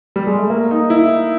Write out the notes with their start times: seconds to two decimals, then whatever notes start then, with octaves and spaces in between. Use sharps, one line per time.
0.16 G3
0.27 G#3
0.38 A3
0.50 A#3
0.71 D#4
0.90 E4